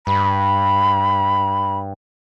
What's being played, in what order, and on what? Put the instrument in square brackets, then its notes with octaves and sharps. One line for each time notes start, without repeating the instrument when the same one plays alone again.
[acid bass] G2 [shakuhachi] B5